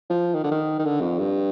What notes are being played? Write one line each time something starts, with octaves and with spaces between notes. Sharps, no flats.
F3
D#3
D3
D#3
D#3
D3
F2
G2